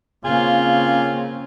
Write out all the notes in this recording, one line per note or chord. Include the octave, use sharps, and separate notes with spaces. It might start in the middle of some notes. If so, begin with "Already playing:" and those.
C#3 A#3 C4 C#4 F4 G#4